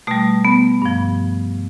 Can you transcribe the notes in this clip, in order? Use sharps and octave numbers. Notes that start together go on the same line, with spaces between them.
B2 G3 A3
B3
G2 F3